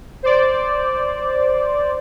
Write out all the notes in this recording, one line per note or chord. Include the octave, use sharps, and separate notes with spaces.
C5 D5